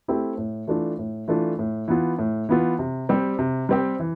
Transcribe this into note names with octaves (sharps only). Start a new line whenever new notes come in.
A3 C4 E4 G4
A2
E3 A3 D4 F4
A2
E3 A3 D4 F4
A2
E3 B3 F4
A2
E3 B3 F4
C3
G3 C4 G4
C3
G3 C4 G4
E3